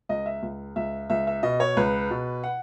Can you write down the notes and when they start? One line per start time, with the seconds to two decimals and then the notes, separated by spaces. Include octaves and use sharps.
0.09 C#2 D#5
0.26 E5
0.43 C#2
0.76 C#2 E5
1.10 C#2 E5
1.27 E5
1.43 B2 D#5
1.60 C#5
1.77 C#2 B4
2.11 B2
2.44 F#5